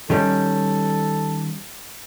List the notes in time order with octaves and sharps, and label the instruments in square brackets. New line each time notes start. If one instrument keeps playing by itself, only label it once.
[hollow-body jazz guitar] D#3 G3 C#4 [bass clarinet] A4